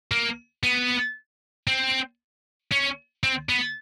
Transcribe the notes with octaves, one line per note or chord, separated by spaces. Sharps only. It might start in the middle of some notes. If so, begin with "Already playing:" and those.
A#3
B3
C4
C#4
C4
B3